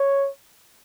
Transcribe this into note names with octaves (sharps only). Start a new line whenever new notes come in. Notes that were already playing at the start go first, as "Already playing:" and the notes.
Already playing: C#5